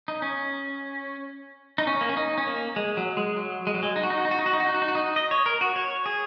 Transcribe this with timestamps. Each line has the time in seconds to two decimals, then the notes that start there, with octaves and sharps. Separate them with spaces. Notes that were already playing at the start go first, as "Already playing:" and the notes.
0.08 D#4
0.22 C#4
1.78 D#4
1.87 C#4
2.01 A#3
2.09 C#4
2.17 D#4
2.38 C#4
2.47 A#3
2.76 G#3
2.97 F#3
3.17 G#3
3.36 F#3
3.67 G#3
3.74 F#3
3.83 G#3
3.96 D#4
4.03 F#4
4.10 D#4
4.18 F#4
4.25 D#4
4.31 F#4
4.39 D#4
4.46 F#4
4.53 D#4
4.60 F#4
4.67 D#4
4.74 F#4
4.82 D#4
4.88 F#4
4.95 D#4
5.16 D#5
5.31 C#5
5.46 A#4
5.61 F#4
5.76 C#5
6.06 G#4